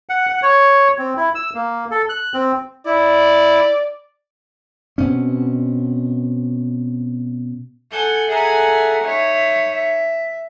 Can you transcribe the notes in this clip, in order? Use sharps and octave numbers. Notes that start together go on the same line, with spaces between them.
F#5
F#5
C#5
C4
E4
E6
A#3
A4
F#6
C4
E4 D5
B2 C4 C#4
A4 F#5 G#5 G6
G#4 A4 E5 F#5 G#5 A#5
D#4 C#5 E5
E5